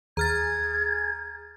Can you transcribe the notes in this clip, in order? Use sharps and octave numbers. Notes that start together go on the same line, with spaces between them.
D#2 G#4 A#5 F6 G#6 A6